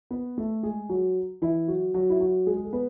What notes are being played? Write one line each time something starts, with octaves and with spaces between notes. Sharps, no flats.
B3 B4
A3 A4
G#3 G#4
F#3 F#4
E3 E4
F#3 F#4
F#3 F#4
E4
F#3 F#4
G#3 G#4
G#4
A4
B3 B4